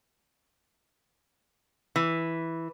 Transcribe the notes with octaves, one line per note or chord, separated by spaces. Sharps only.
E3